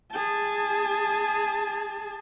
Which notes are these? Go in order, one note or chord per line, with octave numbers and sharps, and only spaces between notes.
G#4 A5